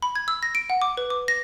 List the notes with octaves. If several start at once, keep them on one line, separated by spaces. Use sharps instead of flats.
B5
G#6
E6
A#6
D7
F#5
D6
B4
D6
A#6